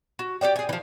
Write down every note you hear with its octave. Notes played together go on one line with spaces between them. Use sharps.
F#4
G4 C5 D5 G5
G#4 G#5
E3 F3